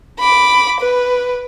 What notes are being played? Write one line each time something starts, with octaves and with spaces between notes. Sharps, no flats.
B5 D6
B4